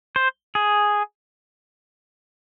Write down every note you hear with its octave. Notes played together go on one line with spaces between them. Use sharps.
C5
G#4